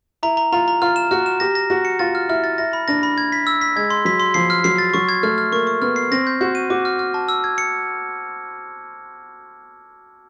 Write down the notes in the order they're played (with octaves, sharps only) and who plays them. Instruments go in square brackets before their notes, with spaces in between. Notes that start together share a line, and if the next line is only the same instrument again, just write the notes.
[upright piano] E4 [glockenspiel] A#5
[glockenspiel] A#5
[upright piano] F4 [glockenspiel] A#5
[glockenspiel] A#5
[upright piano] F4 [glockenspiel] F6
[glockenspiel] E7
[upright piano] F#4 [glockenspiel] F6
[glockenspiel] E7
[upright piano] G4 [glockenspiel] A#6
[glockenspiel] A#6
[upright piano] F#4 [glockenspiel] A#6
[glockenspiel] C#7
[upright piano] F4 [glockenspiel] A6
[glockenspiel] F6
[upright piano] E4 [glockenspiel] F6
[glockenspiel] A6
[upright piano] E4 [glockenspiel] A#6
[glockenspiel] B5
[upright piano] D4 [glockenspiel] A#6
[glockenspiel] B5
G#6
B6
E6
B6
[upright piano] G#3 [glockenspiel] G#6
[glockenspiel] C6
[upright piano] F#3 [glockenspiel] B6
[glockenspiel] C6
[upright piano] F3 [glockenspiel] C7
[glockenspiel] F6
[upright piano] F#3 [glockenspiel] C7
[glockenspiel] A6
[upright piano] F#3 [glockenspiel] C#6
[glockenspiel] G#6
[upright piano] A3 [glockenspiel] F6
[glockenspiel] F6
[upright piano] A#3 [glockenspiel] C#6
[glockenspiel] C#6
[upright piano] B3 [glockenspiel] F6
[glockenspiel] C7
[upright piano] C4 [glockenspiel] A#6
[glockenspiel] G6
[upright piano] F#4 [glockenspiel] G6
[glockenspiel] D#7
[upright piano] F#4 [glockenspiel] D6
[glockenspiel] F6
F6
A5
E6
G#6
C#7